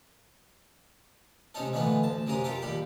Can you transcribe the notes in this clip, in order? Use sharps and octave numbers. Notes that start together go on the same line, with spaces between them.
C3 G#3 C#4 D#4 A4
A#2 D3 E3 G#3 A3 B3
D2 A5
F#2 C3 G#3 A#3 A#5 D#6
F4 G4 A4 A#4
A#1 D#2 G3 G4 B5